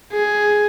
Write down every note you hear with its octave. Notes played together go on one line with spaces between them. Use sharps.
G#4